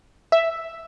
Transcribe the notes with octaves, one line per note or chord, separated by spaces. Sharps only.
E5